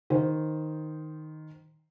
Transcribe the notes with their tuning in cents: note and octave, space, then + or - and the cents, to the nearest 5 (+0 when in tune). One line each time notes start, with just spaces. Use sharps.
D#3 +0 C5 +0